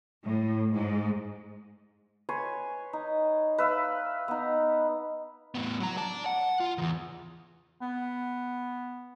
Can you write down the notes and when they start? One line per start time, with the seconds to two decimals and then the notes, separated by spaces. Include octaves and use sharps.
0.24 A2
0.74 G#2
2.29 B4 C#5 G#5 C6
2.93 D#4
3.58 B4 E5 F5
4.28 B3 D#4
5.55 A2 B3
5.80 F#3 A#5
5.97 D5 A5
6.26 F#5
6.60 F4
6.78 E2 D#3
7.81 B3